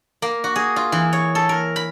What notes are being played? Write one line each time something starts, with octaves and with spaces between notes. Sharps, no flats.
A#3
F#4
G#4
F4
E3
C#5
A4
A#4
B5